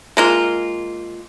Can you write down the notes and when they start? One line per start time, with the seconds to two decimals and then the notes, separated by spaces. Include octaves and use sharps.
0.17 G#3 A#3 F4